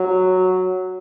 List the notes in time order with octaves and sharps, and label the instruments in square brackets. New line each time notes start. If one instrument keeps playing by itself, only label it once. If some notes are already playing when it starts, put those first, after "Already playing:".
Already playing: [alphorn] F#3